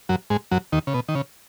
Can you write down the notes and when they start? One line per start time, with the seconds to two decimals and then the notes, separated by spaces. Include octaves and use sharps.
0.09 F#2 F#3
0.30 G#2 G#3
0.51 F#2 F#3
0.73 D#2 D#3
0.87 C#3
0.94 B2
1.08 D#3
1.15 C#3